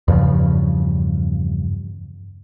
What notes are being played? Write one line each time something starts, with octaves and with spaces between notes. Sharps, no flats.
E2 G2 C#3 F3